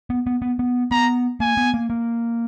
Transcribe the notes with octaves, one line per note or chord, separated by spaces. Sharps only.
B3
B3
B3
B3
B3 A#5
A#3 G#5
B3
A#3
A#3